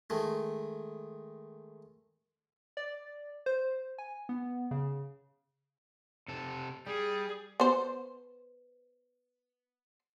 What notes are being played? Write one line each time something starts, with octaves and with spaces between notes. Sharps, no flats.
D#3 G#3 A3
D5
C5
G#5
B3
C#3
C3 A4
G3 G#4
B3 C5